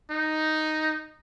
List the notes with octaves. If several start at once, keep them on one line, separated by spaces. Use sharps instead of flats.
D#4